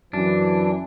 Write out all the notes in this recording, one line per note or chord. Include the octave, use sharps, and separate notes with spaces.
F#2 E3 D4